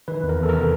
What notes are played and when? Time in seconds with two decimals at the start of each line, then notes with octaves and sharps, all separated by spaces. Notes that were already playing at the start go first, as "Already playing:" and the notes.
0.08 D#3 B4
0.23 E2
0.29 A#4
0.40 E2 A4
0.49 A#4
0.54 C3